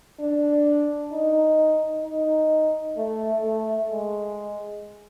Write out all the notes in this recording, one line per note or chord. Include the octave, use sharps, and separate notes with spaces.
D4
D#4
D#4
A3
A3
G#3